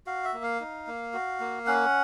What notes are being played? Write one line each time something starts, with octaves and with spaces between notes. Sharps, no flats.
F#4 F5
E5
A#3
F5
D#4
A#3
F#4
A#3
C#4 F#5